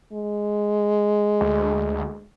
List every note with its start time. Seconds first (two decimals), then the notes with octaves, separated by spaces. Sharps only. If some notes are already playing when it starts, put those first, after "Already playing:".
0.13 G#3
1.41 D2